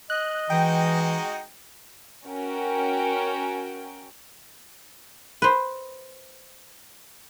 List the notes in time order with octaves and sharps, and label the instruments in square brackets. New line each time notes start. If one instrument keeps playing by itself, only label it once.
[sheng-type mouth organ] D#5 [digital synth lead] F#6
[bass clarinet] E3 [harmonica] G#3 D#4 F#4 [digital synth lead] G5
[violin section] C#4 F#4 A#4 G5
[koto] B4 C5